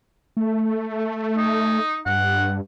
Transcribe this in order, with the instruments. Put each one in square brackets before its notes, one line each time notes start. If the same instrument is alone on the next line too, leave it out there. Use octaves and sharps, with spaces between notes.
[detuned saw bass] A3
[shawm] D#4
[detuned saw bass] G2 [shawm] F#5